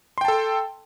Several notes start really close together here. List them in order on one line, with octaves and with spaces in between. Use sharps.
C6 G5 A5 A4